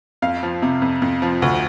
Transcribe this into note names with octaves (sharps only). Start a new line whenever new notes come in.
F2 F5
F3
C3
F2
F2
F3
D2